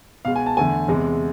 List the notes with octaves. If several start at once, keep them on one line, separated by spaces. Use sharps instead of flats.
B2 G#3 F5
G#5
A5
E2 D3 A3 G#5
E2 C3 G#3